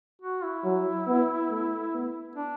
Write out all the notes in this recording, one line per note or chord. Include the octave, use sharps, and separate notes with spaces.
F#4
E4
F#3
B3
A3
B3
D4